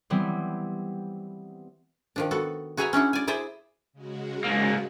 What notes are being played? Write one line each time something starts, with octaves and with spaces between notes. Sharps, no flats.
E3 G3 B3 C4
D#3 F3 D4
B3 F#4 A4
F#4 G#4 B4 E5 G#5 A#5
C#4 D4 E4 F#4
D5 G#5
E4 G#4 C5 D5 E5
C#3 G#3 F#4
G#2 A#3